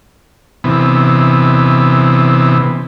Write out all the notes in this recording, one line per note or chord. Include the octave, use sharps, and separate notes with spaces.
C3 E3 B3